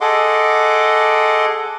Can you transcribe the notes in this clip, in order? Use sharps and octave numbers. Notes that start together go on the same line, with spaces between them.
G#4 A4 D#5 F#5 C6 D6